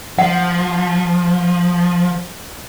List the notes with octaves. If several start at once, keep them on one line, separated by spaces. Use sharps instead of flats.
F3 F#5